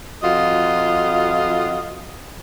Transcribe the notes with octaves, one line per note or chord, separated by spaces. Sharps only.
F2 F4 F#4 D#5